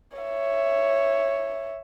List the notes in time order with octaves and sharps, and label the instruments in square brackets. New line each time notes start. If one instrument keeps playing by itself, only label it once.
[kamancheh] C#5 E5